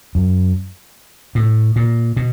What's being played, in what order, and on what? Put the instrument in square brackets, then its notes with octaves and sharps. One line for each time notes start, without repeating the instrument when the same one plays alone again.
[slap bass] F#2
A2
A#2
B2